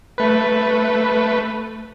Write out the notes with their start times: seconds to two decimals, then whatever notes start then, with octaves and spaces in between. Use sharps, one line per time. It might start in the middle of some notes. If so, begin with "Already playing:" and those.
0.18 A3 B4